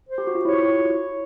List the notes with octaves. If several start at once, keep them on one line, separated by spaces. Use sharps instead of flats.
C5
G4
F#4
F4
E4 C#5